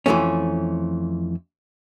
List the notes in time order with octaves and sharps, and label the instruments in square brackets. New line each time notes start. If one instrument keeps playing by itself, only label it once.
[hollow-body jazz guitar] F2 E3 F#3 A3 C#4